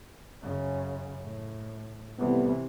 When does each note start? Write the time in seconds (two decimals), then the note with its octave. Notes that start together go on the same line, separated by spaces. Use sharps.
0.42 F#2 C#3
1.23 A2
2.19 A2 C3 E3 G3 B3